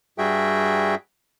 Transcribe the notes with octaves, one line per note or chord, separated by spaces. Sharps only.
G2 G3 F#4 G#4 E5 G5